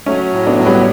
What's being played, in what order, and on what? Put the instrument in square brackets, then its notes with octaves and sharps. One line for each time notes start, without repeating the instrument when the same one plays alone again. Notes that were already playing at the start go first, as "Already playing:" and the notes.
[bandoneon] F#3 [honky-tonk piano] A3 C#4
[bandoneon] A2
[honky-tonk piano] B3 D4
[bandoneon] F#3
[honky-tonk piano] G3 B3